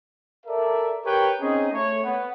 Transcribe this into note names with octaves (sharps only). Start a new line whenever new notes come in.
A4 A#4 D5 E5
G4 A#4 B4 C#5 G5
C4 C#4 D#4 G#4 D#5
A3 C#5
B3